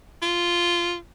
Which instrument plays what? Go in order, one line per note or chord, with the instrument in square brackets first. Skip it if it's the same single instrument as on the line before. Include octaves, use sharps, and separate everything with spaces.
[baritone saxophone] F4